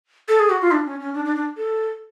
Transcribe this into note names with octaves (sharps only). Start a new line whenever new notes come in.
A4
G#4
F#4
F4
D4
C#4
C#4
D4
D4
D4
A4